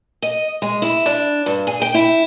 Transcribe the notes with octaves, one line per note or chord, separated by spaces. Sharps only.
D#5
G#3
E4
D4
G2
G#4
G5
E4